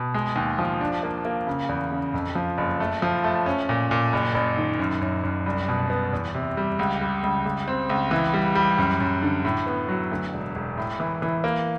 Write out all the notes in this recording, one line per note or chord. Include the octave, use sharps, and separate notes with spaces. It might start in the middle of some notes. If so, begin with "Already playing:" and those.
Already playing: B2
G#3
D#2
F3
D4
A#3
A#3
C#3
E2
C#3
F2
F3
F#1
A3
F3
A3
C#4
A#2
A#2
F#1
F#1
D#3
F#2
F#2
F#2
C2
B2
B3
E2
C3
G3
C#2
G3
C#2
C#2
C4
C#2
E3
G3
G3
F#2
F#2
D3
A2
B3
F#3
D2
E1
E1
A2
E3
E3
A#3